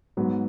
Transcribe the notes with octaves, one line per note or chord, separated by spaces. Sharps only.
G#2 F#3 B3